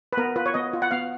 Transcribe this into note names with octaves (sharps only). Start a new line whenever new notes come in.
B4
B3 A#4
F4 B4
C#5
B3 D#5
F4
F#5
B3 F5